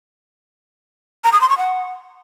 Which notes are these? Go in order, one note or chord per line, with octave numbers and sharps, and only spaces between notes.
A#5
D#6
C6
C#6
F#5